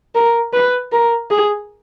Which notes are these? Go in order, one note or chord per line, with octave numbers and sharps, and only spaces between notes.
A#4
B4
A#4
G#4